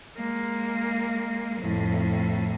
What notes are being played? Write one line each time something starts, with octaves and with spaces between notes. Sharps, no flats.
G#3 A#3
F2 A2